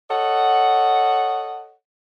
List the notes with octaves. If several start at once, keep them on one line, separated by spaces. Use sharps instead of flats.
A4 C#5 D#5 F#5